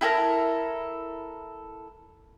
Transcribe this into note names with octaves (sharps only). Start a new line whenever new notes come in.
E4 G4 A4 A#4